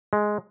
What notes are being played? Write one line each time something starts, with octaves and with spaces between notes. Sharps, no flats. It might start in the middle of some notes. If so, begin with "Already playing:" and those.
G#3